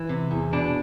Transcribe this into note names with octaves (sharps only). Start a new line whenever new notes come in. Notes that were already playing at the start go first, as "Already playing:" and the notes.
Already playing: E3
C3
E2
B2 D4